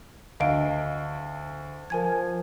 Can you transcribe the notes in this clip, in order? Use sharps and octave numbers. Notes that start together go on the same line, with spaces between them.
D2 D#5 F5 D7
F3 A#4 G#5 G#6